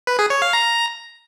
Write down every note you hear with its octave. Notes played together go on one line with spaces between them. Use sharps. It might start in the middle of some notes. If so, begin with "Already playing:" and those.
B4
G#4
C#5
F5
A#5